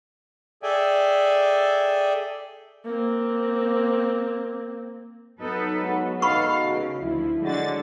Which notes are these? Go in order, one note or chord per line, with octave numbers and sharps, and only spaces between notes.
G#4 A4 D5 E5 G5 G#5
A#3 C4
F#3 B3 D#4 A4 B4
G#3 B3 F#4
D#4 A4 F5 B5 C#6
C#3
D2 F3 E4
D3 F#3 G#3 F#4 A6